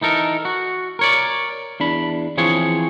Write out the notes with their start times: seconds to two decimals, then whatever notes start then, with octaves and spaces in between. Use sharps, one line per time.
0.02 E3 D#4 A4 A#4
0.45 F#4
0.99 A#4 C#5 D5
1.80 E2 D4 B5
2.37 E3 F3 C4 G#4 C#5